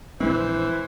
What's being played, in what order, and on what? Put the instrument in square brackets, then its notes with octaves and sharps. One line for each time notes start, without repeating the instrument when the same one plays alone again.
[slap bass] A#1 G#3 C4 [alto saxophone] E3 [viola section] C5